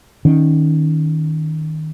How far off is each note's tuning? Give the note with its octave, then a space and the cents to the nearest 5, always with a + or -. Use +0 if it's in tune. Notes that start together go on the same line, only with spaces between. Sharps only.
D#3 +5 C#4 +0